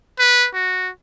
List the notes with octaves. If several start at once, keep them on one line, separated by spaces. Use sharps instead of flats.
B4
F#4